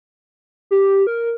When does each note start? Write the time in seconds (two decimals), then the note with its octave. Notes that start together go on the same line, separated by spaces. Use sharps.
0.71 G4
1.07 A#4